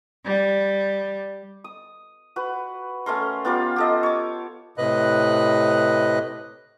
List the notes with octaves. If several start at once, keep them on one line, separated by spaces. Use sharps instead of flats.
G3
D#6
F#4 B4
A3 C#4 A#4 C6
B3 F4 G4 A#4
G4 A4 D#5
C#5 D6
A2 C3 B4 D#5 F#6